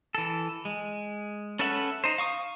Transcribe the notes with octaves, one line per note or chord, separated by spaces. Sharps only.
E3 A4
G#3
C#4 A4 B4 E5 F#5
D#4 C5
F5 C#6 D#6